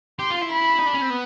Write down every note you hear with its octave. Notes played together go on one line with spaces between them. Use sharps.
G4 C6
F4
E4
B5
D#4
D4
C#4
C4
B3